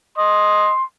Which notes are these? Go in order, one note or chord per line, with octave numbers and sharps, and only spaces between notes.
D#5 C6